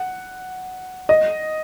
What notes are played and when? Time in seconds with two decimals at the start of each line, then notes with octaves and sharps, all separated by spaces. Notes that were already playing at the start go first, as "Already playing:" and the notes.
Already playing: F#5
1.09 D#5